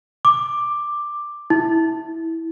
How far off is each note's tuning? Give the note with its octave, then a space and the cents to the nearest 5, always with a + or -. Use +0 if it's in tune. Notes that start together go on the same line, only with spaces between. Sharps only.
D6 +10
E4 -10